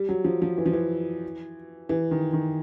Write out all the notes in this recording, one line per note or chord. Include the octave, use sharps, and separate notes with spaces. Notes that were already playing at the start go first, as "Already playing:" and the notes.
Already playing: G3
F#3
F3
F3
E3
F3
E3
E3
D#3
D#3